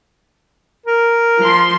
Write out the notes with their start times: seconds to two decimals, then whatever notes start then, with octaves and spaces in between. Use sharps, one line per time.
0.86 A#4
1.39 F3 C6